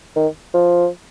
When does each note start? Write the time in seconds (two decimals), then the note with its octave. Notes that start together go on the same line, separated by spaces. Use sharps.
0.16 D#3
0.54 F3